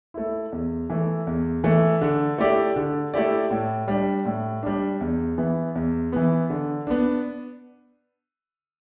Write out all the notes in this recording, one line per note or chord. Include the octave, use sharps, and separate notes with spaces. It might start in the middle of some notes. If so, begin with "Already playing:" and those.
A3 E4
E2
E3 A3
E2
E3 A3
D3
A3 E4 G4 D5
D3
A3 E4 G4 D5
A2
G3 D4
A2
G3 D4
E2
E3 B3
E2
E3 B3
D3
B3 D4